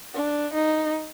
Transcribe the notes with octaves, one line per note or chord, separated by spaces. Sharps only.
D4
D#4